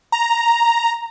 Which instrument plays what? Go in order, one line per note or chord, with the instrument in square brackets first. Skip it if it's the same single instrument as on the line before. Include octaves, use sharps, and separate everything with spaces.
[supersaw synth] A#5